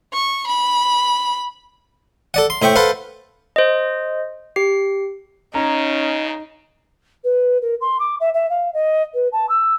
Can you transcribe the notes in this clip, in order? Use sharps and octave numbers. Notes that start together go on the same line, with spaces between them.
C#6
B5
A4 D5 F#5
C6
A2 C5 E5 G5 C#6
A4 B4 C5 F5 F#5
C5 D#5
G4 C7
C#3 C#4 D#4 A#5
B4
A#4
C6
D6
E5
E5
F5
D#5
B4
A5
E6